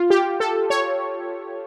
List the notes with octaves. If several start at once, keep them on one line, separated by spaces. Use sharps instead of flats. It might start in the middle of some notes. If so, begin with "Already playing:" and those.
Already playing: F4
G4
A4
C#5